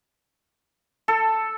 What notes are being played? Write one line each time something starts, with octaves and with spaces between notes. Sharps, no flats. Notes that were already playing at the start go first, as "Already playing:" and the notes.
A4